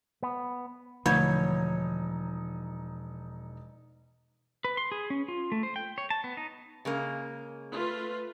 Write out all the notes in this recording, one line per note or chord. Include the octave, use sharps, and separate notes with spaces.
B3
E1 D3 F3 A3 D#4 C#5
B4
C6
G#4
C#4
F4
A3
C5
G5
C#5
A5
B3
D#4
C#3 G#3 A#3
A3 F4 B4